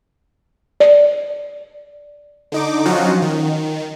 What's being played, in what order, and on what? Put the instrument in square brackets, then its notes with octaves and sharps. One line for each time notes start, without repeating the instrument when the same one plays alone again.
[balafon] D5
[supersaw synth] D3 D#4 D6
F3 F#3 C#4 D#4 F4 F#4
D#3